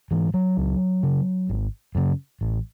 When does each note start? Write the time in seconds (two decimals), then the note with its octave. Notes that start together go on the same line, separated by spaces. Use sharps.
0.11 G#2 E3
0.34 F#3
0.57 C#2
1.03 C#3
1.49 G#1
1.95 F#2 C#3
2.41 A1